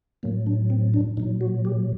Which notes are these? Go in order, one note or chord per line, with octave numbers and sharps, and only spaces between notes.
A2 F#3 A#3
D4
C4
D4
A#2 F#3 D#4
F#4
G4